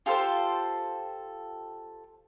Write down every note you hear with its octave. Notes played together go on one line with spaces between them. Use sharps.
F4 G4 A4 C5